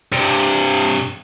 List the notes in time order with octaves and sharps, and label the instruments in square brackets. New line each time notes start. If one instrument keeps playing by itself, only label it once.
[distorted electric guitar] G2 C3